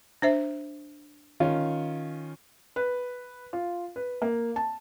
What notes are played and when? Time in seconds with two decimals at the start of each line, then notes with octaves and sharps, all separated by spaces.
0.22 D4 C5 E5
1.40 D#3 C#4 F4
2.76 B4
3.53 F4
3.96 B4
4.22 A#3
4.56 A5